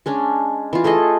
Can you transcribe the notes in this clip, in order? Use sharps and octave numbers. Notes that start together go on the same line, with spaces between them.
G#3 C#4 D4
E3 F4
A3 G#4 A4 D#5